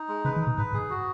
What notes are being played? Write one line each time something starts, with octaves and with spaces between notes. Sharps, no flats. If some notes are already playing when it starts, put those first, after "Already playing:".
Already playing: D#4
G#3
C#3 B4
D#3
D#4
B2
G#2 B4
G#2 G#4
F#4